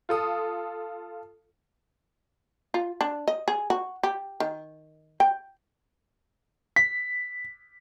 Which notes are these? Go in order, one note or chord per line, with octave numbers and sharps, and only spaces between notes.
F4 A4 D#6
F4
D4
D#5
G#4
F#4
G4
D#3
G5
B6